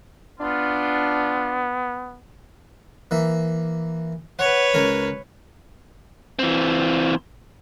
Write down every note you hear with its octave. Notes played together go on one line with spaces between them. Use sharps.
B3 D4 F4
E3 A#3 E5
B4 C#5 F#5
C#2 A#4 G#5
E3 C4